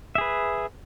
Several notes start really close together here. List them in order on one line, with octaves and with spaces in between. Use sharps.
E5 G#4 B4